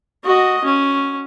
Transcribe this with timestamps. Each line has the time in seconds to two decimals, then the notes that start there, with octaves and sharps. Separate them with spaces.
0.25 F#4 D#5
0.64 C#4